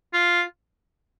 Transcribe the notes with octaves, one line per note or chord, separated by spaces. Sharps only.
F4